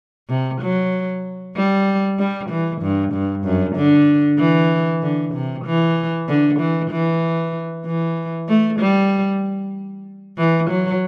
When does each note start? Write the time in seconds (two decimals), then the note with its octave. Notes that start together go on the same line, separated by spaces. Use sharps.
0.29 C3
0.61 F#3
1.56 G3
2.19 G3
2.50 E3
2.82 G2
3.13 G2
3.44 F#2
3.76 D3
4.39 E3
5.03 D3
5.34 C3
5.65 E3
6.29 D3
6.60 E3
6.91 E3
7.86 E3
8.48 A3
8.80 G3
10.38 E3
10.70 F#3